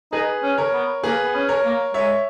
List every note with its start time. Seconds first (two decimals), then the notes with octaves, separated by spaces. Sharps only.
0.12 D#4 G#4 B4
0.43 C#4
0.58 A#4 C#5
0.73 B3
1.03 A#3 G#4 B4
1.25 B3
1.34 C#4
1.49 A#4 C#5
1.65 A#3
1.94 G#3 C#5 E5